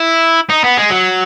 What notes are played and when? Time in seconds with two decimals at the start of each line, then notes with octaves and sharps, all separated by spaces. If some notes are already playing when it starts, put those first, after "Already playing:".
Already playing: E4
0.50 D#4
0.64 B3
0.78 G#3
0.90 F#3